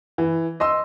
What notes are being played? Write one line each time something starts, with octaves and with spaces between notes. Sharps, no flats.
E3
D#5 C6 E6